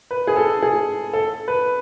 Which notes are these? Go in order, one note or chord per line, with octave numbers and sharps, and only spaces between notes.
B4
G#4
A4
G#4
A4
B4